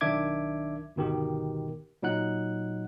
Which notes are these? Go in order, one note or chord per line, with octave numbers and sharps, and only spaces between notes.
B1 D#3 D4 E5 D6 G#6
G1 B2 D#3 G4
A#2 F#3 D#4 F#5 F#6